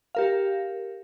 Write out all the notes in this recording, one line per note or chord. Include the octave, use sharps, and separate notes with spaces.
G4 A#4 F5